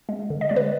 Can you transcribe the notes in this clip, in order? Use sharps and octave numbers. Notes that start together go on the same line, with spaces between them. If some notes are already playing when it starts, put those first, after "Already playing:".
G#3
D3
D#5
G#3 D5
B4